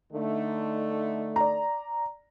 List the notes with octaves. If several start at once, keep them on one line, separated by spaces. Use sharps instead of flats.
D3 A3 D#4
D5 A#5